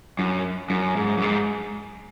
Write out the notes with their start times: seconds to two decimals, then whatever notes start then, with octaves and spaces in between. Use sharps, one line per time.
0.19 F#2
0.70 F#2
0.97 G#2
1.18 F#2
1.22 G#2